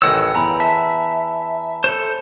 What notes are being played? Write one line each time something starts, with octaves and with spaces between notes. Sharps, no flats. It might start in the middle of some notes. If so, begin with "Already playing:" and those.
A1 D#3 C#5 F#5 E6
E2 G#5 A#5 B5
E5 A5
A4 C5